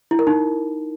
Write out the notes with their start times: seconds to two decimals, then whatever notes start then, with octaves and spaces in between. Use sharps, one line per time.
0.11 E4
0.19 A#4
0.27 D#4